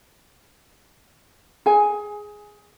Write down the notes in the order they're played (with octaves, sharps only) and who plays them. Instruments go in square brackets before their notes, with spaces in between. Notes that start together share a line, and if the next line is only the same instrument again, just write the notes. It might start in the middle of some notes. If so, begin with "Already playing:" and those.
[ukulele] G#4 G#5